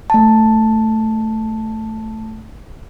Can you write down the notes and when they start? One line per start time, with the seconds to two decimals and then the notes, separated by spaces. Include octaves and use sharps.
0.10 A3 A5